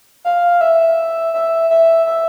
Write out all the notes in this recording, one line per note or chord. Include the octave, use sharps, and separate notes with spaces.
F5
E5
E5
E5
E5